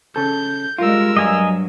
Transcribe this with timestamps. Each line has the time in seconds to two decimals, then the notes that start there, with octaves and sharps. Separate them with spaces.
0.16 C#3 A4 G6
0.78 G3 G#3 F4 A#4 E6
1.17 G2 F#3 D#5 G#5 A#5